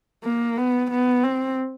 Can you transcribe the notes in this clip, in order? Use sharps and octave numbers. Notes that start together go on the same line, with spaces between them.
A#3
B3
B3
C4